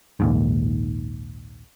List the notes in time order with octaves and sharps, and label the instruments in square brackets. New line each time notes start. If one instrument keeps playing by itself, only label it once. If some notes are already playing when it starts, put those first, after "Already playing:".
[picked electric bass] A#1 D#2 G#2